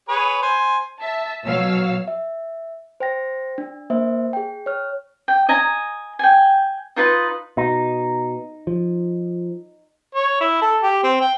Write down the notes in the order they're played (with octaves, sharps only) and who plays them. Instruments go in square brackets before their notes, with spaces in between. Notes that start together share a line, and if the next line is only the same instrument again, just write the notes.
[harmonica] G#4 B4 C#5
C5 G#5
[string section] E5 A5
B2 F#3 C#5 F5 E6
[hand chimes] E5
C5 G5 A#6
D4
A#3 C5 E5
G#4 G5
C#5 F6
[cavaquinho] G5
D#5 G#5 A#5
G5 G#5
D#4 F4 B4 D#5
[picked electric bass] B2 [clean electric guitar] D#4
[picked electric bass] F3
[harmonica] C#5
E4
A4
G4
C4
G5